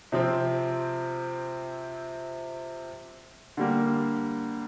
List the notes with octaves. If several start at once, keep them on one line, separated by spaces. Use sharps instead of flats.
C3 F3 C4
D3 G3 A#3